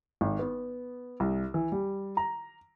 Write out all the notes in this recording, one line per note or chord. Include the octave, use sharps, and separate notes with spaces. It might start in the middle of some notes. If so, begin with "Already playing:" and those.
G#1
B3
C2
E3
G3
A#5